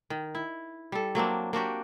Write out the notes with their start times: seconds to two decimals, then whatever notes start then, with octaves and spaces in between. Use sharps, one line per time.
0.10 D#3
0.35 E4
0.92 G3 A4
1.15 F#3 A#3 C4 D4
1.53 A#3 D4 F#4 G4